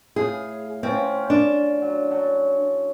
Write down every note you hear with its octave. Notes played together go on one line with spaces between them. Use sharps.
A2 G#4 F5
C4 C#4 F4
D4
F#3
F#3 A4